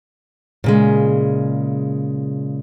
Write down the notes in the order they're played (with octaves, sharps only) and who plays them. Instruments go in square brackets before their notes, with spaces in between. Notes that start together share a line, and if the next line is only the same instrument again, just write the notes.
[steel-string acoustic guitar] A#2 C#3 G#3